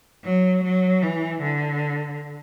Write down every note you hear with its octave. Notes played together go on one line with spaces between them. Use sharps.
F#3
F#3
E3
D3